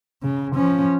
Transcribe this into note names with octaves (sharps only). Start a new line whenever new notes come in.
C#3
F3 C#4